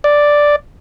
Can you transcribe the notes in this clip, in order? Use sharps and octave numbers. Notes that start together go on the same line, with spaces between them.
D5